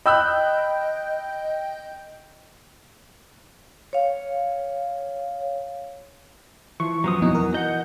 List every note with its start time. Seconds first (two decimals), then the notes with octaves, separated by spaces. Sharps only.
0.06 D#5 G5 B5 E6 F#6 G6
3.93 C#5 F5
6.80 E3 F3 C#6
7.04 F#2 F3 F#3 B3 D#6
7.22 F2 B2 E3 D#4
7.35 A#4
7.54 D#5 F#5 G6